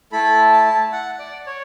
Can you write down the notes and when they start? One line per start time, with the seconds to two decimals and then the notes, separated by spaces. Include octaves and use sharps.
0.12 A3 E4 A4 B5
0.52 A5
0.92 F#5
1.19 D5
1.47 C#5